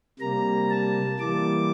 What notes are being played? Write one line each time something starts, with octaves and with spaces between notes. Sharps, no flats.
C3 G3 A#3 A#5
A5
E3 G3 A#3 D6